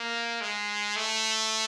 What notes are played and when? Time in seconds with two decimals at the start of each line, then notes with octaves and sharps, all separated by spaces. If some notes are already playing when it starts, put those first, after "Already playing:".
Already playing: A#3
0.41 G#3
0.96 A3